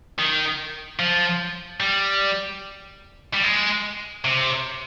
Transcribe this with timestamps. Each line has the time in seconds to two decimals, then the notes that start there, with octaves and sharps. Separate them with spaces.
0.19 D#3
0.99 F3
1.80 G3
3.34 G3
3.43 G#3
4.25 C3